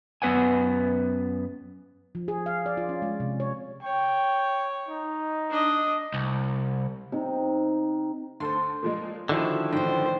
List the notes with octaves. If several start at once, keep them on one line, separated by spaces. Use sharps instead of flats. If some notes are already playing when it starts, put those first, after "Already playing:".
F#2 B3 B4 F#5 G#5
F3
G#4
F5
D5
F4
C#4
G#3
C3
C#5
C#5 G5
D#4
D4 D#5
C2
C3 D#4
D2 A4 C5 C6
A#2 F3 G#3
D3 D#3 F3 E4 F#4
A1 G#2 B3 C5 G5